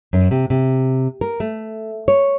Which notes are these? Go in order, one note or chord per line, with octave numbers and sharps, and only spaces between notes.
F#2
C3
C3
A#4
A3
C#5